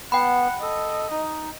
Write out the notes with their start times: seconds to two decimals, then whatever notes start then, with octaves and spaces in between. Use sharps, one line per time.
0.12 B3 F#5 G5 B5
0.62 A4 D#5
1.11 D#4